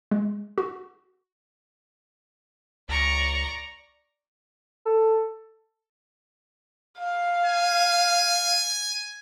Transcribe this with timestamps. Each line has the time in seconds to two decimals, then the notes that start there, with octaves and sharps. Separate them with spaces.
0.11 G#3
0.58 F#4
2.89 C#2 D5 A#5 C#6
4.86 A4
6.99 F5
7.46 G#5